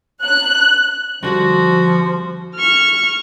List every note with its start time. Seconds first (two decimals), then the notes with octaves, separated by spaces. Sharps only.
0.23 F#6
1.23 F2 D3 F3 G3 F#4
2.55 C#6 F6